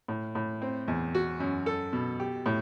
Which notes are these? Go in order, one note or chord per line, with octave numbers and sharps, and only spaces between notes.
A2
A2
C4
E2
F#4
F#2
A4
B2
G4
A2